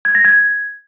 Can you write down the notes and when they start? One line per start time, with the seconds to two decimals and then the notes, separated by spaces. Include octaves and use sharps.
0.05 G#6
0.15 A#6
0.25 G#6